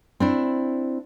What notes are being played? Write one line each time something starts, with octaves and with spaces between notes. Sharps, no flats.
C4 D4 E4